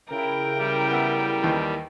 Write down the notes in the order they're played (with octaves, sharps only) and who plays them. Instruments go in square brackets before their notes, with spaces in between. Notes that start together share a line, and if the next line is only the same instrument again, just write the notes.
[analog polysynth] C#3 E4 [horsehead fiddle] A#4 G5
[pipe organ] G3
[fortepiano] B3 E5
D#2 D#3 E3